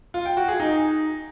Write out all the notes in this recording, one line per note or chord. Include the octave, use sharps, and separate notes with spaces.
F4
G5
F#4
G#4
D#4